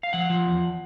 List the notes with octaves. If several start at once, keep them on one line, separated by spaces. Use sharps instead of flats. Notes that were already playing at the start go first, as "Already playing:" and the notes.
F5
F3 F#5
F3
E2